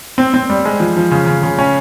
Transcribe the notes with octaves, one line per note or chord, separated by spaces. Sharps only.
C4
C4
G3
G#3
F3
F3
C#3
C#3
C#3
C#4